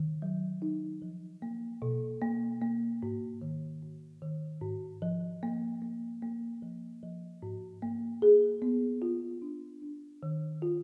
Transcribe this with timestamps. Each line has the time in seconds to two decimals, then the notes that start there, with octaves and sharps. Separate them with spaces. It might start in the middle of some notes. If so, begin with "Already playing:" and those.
Already playing: D#3
0.22 F#3
0.62 D#4
1.02 F3
1.42 A#3
1.82 B2
2.21 A#3
2.62 A#3
3.02 G#2
3.42 D#3
3.82 G#2
4.22 D#3
4.62 G#2
5.02 F3
5.43 A#3
5.82 A#3
6.22 A#3
6.62 F3
7.03 F3
7.42 G#2
7.82 A#3
8.22 G#4
8.62 B3
9.02 F4
9.42 D4
9.82 D4
10.23 D#3
10.62 F4